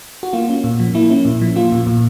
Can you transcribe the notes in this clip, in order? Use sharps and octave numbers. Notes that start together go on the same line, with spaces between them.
F#4
A#3 F4
C#4
A#2
F3
A#3 E4
C#4
A#2
F3
A#3 F4
A#2
A#2